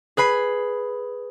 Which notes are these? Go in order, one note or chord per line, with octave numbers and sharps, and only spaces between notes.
G#4 B4 B5 C7